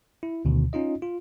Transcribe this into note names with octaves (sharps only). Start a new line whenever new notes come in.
E4
D2 B2 D3 D#3
C#4 D#4 F4 D#5
F4